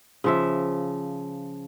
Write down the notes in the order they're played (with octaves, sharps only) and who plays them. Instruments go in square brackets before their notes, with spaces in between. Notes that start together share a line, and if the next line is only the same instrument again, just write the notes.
[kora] C#3 F3 E5